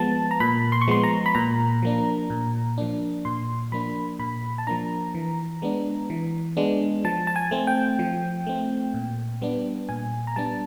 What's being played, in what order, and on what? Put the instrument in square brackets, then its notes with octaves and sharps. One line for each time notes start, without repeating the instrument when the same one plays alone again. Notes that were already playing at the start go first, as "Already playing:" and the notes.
Already playing: [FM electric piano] F3 G#3 B3 A5
A#5
A#2 B5
C6
C#6
F3 G#3 B3 C6
A#5
B5
A#2 A#5
F3 A#3 D4
A#2
F3 A#3 D4
A#2 C6
F3 A#3 D4 B5
A#2 B5
A5
F3 A#3 D4 A#5
E3
G#3 B3 D4
E3
G#3 B3 D4
F3 A5
A5
G#5
A3 C4
G5
F3
A3 C4
A#2
G3 B3 D4
A#2 G#5
A#5
G3 B3 D4 A5